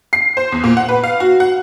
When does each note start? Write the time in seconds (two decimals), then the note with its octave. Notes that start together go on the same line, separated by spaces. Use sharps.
0.13 C7
0.37 C5
0.52 E2
0.64 A#2
0.77 F#5
0.89 B4
1.04 F5
1.20 F#4
1.40 F#5